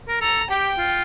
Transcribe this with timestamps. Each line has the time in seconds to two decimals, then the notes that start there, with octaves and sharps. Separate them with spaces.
0.08 A#4
0.21 A4 A#5
0.50 G4 G5
0.78 F4